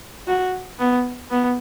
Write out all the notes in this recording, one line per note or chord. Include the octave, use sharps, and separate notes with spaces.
F#4
B3
B3